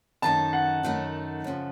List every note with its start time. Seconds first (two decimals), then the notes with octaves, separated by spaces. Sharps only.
0.22 F#2 D#3 A3 D#4 A5
0.53 F#5
0.83 F#2 D#3 A3 D#4
1.44 F#2 C#3 F3